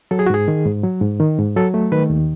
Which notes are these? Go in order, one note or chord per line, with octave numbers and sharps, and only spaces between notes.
F#3 A4
G#4
F#4
G#2 G#4
D#3
G#2
F#3
G#2
D#3
G#2
F#3 A4
A3
D#3 B4
D#2